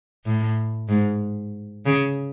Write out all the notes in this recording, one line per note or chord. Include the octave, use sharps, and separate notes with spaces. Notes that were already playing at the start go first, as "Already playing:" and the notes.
A2
G#2
C#3